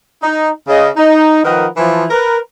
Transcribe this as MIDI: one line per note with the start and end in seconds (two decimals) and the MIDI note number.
0.22 0.50 63
0.68 0.88 49
0.68 0.88 75
0.96 1.43 63
1.44 1.67 51
1.44 1.67 53
1.44 1.67 70
1.44 1.67 71
1.44 1.67 75
1.44 1.67 78
1.77 2.05 52
1.77 2.05 53
2.10 2.38 70
2.10 2.38 71